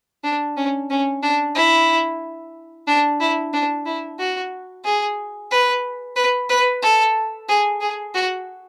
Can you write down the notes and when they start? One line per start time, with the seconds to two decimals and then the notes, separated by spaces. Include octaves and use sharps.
0.23 D4
0.56 C#4
0.90 C#4
1.23 D4
1.55 E4
2.87 D4
3.20 E4
3.53 D4
3.86 E4
4.19 F#4
4.84 G#4
5.51 B4
6.16 B4
6.49 B4
6.82 A4
7.49 G#4
7.81 G#4
8.14 F#4